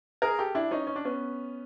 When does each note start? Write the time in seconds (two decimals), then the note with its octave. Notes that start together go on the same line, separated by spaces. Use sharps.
0.22 G#4 A#4
0.39 G4 A4
0.55 D4 E4
0.71 C#4 D#4
0.87 C#4
0.96 D4
1.05 B3 C#4